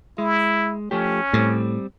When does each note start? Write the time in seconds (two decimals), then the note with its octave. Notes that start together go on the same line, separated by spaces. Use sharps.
0.18 G#3 E4
0.91 F3 A3 C#4 G4
1.33 A2 G3 C4